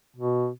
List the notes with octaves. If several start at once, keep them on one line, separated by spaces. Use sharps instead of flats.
B2